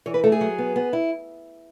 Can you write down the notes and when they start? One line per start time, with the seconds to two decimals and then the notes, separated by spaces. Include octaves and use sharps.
0.06 E3 C#5
0.14 B4
0.24 A3 A4
0.32 G#4
0.41 F#3
0.58 B3
0.76 B3
0.93 E4